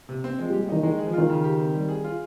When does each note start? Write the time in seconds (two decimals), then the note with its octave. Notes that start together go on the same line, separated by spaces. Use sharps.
0.09 C3
0.24 C4
0.39 F3 G#3
0.50 G3
0.53 G4
0.61 G3
0.69 D#3 D#4
0.83 D#3 G#3
0.99 G#4
1.07 F3
1.13 D#3 F4
1.29 C#3
1.44 G4
1.59 C4
1.75 G3
1.89 G#4
2.04 F4